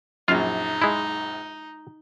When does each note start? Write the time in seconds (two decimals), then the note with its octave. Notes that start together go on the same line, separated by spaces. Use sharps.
0.28 A#1 F#2 D#4 F4 F5
0.82 G#3 E4